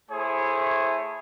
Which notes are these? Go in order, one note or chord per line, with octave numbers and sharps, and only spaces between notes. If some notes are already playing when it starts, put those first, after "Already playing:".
A3 E4 G#4 C5 C#5 E5